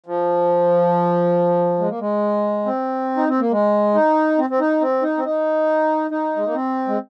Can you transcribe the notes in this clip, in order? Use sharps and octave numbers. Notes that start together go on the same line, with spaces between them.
F3
G#3
A#3
G#3
C4
D#4
C4
A#3
G#3
D#4
C4
C4
D#4
C4
D#4
C4
D#4
D#4
G#3
A#3
C4
G#3